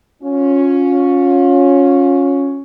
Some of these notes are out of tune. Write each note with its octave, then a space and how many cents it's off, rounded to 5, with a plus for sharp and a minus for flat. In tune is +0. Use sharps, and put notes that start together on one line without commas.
C#4 +0 F4 +35